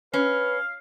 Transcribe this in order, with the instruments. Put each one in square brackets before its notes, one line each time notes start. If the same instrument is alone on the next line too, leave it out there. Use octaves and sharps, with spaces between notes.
[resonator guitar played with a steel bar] C#4 [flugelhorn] B4 [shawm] F5